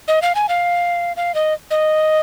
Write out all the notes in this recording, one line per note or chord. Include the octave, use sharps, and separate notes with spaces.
D#5
F5
G#5
F5
F5
D#5
D#5